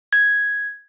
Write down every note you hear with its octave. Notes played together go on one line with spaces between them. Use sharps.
G#6